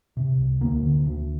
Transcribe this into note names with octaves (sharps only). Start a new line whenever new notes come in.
C3
C2
D2 A#3
D3
D2